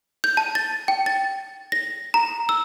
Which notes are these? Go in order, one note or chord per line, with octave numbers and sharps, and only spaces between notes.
G6
A5
A6
G5
A6
A#6
A#5
E6